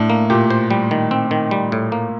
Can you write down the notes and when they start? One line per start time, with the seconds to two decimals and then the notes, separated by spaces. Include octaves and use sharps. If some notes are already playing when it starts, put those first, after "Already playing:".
Already playing: A2 D4
0.10 A#3
0.30 A#2 G4
0.50 C5
0.70 G3
0.91 D#3
1.11 C4
1.31 D#3
1.51 G3
1.72 A2
1.92 A#3